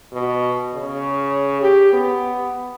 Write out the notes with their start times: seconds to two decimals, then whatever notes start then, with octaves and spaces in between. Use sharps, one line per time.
0.13 B2
0.74 C#3
1.61 G4
1.93 B3